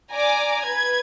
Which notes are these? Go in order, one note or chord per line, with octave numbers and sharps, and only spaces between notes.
D5 G#5 A#5 D6
B4 G#6